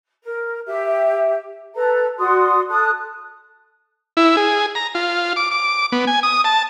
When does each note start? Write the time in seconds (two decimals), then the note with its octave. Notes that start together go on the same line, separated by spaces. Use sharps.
0.23 A#4
0.67 G4 E5
1.74 A4 B4 A#5
2.18 F#4 D5 C6 D#6
2.69 A4 D#6 F#6
4.17 E4
4.37 G#4
4.75 A#5
4.95 F4
5.36 D6
5.51 D6
5.92 B3
6.07 G#5
6.23 D#6
6.44 A5